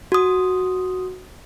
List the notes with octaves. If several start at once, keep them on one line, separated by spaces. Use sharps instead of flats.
F#4 D#6